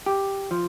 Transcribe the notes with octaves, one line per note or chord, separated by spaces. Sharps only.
G4
F3